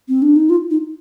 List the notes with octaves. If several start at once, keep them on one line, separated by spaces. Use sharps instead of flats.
C4
D4
D#4
F4
D#4